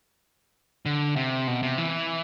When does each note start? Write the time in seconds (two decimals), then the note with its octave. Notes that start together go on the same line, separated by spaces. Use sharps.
0.86 D3
1.16 C3
1.47 B2
1.63 C3
1.78 E3